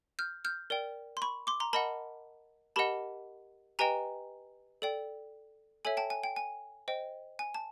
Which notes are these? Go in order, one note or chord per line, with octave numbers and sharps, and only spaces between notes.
F6 G6
F6 G6
A#4 D5 G5
C6
B5 C#6
C6 D6
A#5 C6
A#4 D#5 F#5 A5 B5
G4 A#4 D#5 F#5 A5 B5
G4 B4 D#5 G5 G#5 A#5
A4 D5 G5
A4 C#5 E5 G#5
G5 A5
G#5
G5
G#5
C5 D#5 G5
G#5
A5